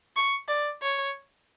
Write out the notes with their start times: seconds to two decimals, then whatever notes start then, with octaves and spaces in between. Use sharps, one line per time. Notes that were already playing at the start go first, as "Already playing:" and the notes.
0.16 C#6
0.49 D5
0.82 C#5